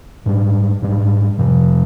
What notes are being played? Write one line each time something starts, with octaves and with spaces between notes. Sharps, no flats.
G#2 G3 D4
G#2 G3 D4
F2 C3 F3